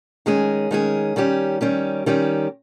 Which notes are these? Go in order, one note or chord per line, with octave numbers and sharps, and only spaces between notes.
D#3 G#3 C#4 G#4
D#3 G#3 C#4 G#4
D#3 G3 C#4 G4
D#3 G3 C#4 G4
D#3 G3 C#4 G4